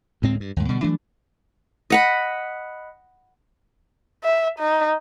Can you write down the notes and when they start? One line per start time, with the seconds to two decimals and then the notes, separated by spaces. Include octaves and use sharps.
0.22 D2 A2 G#3 C4
0.40 G2
0.56 D#2 G#2
0.68 B2 D3 G3
0.83 E3 F#3 A3 D4
1.90 D#5 F#5 B5
4.23 E5
4.58 D#4